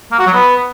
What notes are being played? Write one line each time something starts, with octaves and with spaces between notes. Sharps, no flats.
A#3
F#4
F#3
B3